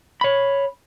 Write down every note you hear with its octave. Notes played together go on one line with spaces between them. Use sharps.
C#5 B5